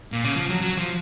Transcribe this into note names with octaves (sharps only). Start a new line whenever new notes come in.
A#2
C#3
F3
F#3
F#3
F3